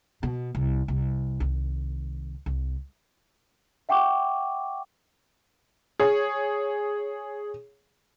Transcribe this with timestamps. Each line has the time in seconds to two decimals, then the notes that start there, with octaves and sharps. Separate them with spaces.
0.23 B2
0.55 C2
0.88 C2
1.40 C2 D#3
2.46 C2
3.89 E5 F#5 G5 C#6 D6
6.00 G#4 C#5